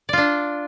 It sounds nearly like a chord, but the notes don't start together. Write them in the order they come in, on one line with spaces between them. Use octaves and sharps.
D5 F4 D4